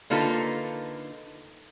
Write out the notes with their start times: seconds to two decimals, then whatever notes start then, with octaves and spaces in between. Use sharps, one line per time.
0.10 D3 A#3 D#4 F4 A4 B4